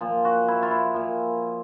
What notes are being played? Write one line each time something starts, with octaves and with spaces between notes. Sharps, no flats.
A#2 F3
F#4
E4
F4
E4
A#2 F3